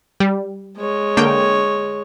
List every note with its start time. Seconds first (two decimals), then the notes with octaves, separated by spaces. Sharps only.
0.20 G3
0.78 G#3 C#5
1.17 D3 A#3 G5